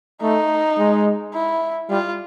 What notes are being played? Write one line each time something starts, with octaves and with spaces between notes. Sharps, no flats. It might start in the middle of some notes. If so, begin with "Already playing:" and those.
A3 D#4
G#3
E4
G3 F4